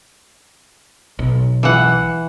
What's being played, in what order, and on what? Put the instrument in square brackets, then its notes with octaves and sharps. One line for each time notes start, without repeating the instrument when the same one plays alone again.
[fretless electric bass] B1
[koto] E3 F#5